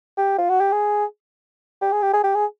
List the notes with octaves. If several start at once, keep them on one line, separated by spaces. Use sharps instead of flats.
G4
F4
F#4
G4
G#4
G4
G#4
G4
G#4
G4
G#4